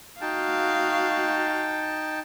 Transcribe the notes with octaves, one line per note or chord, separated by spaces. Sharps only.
D#4 F#4 F5 G5 A5